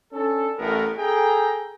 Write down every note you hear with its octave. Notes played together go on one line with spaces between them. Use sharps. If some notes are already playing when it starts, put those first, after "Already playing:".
C#4 D4 A4
A1 A2 B3 A#4
G#4 A4 G5 A#5